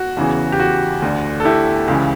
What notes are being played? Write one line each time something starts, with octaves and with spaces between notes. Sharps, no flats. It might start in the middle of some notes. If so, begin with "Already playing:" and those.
Already playing: F#4
E2 C#3 E3
G4
F#4
D2 D3
A4
E4 G4
C#2 C#3 E3